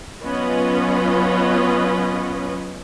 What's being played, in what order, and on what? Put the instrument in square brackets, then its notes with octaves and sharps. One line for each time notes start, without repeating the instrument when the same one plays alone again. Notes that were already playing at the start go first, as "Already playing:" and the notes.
[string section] F#3 B3 C#4 F4 B4 D#5